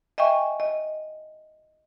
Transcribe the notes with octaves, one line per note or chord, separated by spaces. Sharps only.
D#5 E5 G5 G#5 C#6
D#5